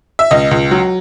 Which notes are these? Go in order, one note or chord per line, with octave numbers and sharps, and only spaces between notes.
E5
C#2 D#5
C#2
F#3